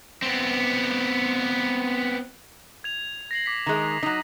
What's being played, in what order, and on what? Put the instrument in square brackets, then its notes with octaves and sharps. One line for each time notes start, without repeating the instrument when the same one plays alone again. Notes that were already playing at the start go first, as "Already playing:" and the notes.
[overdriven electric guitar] B3 C4
[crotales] G#6 F7
A#6 C7 F#7
D6 B6
[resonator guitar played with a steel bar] D#3 G#3
F#3 D#4